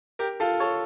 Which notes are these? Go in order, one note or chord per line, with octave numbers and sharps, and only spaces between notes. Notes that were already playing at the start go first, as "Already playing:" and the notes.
G4 A#4
F4 A4
A4 C#5